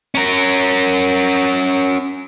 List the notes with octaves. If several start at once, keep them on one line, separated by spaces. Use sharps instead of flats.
C#4 A#4